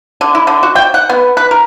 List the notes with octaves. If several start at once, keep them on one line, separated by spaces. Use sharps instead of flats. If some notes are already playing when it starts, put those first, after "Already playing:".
D3
E4
D3
F#4
G5
F#5
B3
B4
A#4